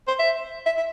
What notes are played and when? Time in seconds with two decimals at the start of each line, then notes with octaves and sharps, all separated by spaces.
0.08 C5
0.19 E5
0.66 E5
0.77 E5